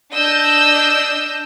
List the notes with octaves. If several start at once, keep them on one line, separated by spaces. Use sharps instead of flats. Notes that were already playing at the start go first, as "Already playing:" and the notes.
D4 D#5 E6 G6